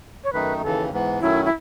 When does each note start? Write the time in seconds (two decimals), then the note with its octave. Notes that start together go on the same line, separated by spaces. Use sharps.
0.24 C#5
0.33 F#2 D#3 A3 D#4 B4
0.62 D#2 C#3 E3 A4
0.91 G#2 E3 B3
1.20 F#2 D#3 F#3 A3 C#4 E4
1.45 E4